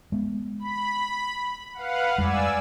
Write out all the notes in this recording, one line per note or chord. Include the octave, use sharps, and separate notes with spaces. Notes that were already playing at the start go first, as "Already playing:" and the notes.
G#3 B3
B5
B4 F5 F#5
F2 G3 G#3 D5 G#5 E6